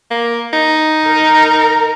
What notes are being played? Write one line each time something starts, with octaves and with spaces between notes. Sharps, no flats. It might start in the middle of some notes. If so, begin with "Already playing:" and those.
A#3
D#4
A#4